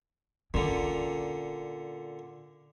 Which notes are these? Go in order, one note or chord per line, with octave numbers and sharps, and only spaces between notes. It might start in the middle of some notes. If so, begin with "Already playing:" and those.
A#2 D3 C#4